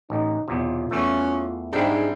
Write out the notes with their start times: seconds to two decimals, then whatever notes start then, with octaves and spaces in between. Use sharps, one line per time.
0.10 A1 D#4
0.48 B1 E2 C3 F4
0.91 E2 E3 A3 C#4
1.73 G#2 G3 C4 D4 E4 G5